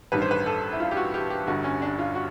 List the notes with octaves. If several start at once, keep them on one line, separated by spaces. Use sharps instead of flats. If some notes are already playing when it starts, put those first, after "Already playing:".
A1 G2 D#3 B4
C5
B4
A4
E4
F4
G4
F#4
G4
G4
G1 G2 D3 F#4
C#4
D4
F4
F#4